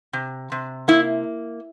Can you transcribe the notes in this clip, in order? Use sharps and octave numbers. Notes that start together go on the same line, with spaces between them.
C3
C3
A#3 E4